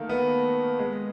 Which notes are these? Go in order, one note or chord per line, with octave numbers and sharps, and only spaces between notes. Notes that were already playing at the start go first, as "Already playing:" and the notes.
Already playing: D#3 A3 A#3
B3
G#3